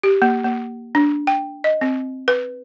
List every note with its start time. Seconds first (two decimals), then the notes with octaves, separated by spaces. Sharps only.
0.03 G4
0.22 A#3
0.44 A#3
0.95 D4
1.27 G5
1.64 D#5
1.81 C4
2.28 B4